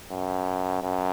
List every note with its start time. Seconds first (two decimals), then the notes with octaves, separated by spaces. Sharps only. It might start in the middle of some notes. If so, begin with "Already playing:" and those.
0.11 F#2
0.82 F#2